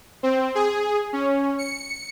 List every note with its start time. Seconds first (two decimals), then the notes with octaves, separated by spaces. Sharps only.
0.23 C4
0.55 G#4
1.13 C#4
1.58 C#7